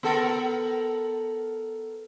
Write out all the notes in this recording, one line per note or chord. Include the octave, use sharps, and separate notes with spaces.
B3 A4 A#4